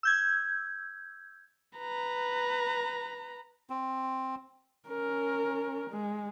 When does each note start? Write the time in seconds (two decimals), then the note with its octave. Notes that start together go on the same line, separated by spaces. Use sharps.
0.03 E6 G6 G#6
1.78 B4 A#5
3.70 C4
4.88 C#4 A#4
5.90 G#3